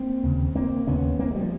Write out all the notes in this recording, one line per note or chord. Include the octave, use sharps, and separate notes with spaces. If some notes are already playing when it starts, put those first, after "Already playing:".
Already playing: A#3 C4
D#2 C#3
A#3 C4
D#2 C#3 B3 C#4
A#3 C4
G#3
F3 G3